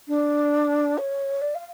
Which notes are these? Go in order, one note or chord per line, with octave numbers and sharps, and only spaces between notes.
D4
C#5
D5
F5